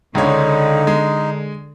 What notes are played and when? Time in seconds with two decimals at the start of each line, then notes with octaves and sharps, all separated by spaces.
0.15 C#2 D3 G#3 D#4 C#5
0.87 G#3